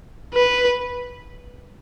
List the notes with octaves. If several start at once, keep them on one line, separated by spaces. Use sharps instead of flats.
B4